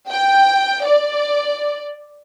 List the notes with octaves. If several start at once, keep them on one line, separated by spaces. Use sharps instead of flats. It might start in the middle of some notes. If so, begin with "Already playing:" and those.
G5
D5